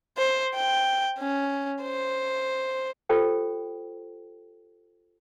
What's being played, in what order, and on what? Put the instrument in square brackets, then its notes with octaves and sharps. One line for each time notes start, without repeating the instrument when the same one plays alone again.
[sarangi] C5
G5
C#4
C5
[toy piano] F4 G4 A4 C5 G5